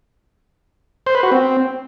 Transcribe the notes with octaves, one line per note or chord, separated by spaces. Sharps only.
C5
B4
F#4
C4